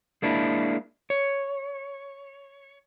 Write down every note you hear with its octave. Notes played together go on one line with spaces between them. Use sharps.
G#3 A#3 D4 E4
C#5